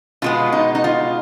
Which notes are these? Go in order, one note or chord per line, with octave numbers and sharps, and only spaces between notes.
B2 G#3 B3 F4
D#4
D#4
F4